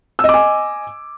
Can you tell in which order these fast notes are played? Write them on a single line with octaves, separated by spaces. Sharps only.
E6 D#5 D6 G#5